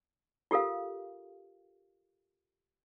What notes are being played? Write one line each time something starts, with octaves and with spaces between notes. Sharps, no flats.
F4 G4 A4 A#4 F5